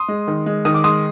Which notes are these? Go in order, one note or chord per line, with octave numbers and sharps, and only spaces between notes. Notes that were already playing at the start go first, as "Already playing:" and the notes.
Already playing: C6 D#6
G#3
D#3
G#3
D#3 D#6
D6
G#3 C6 D#6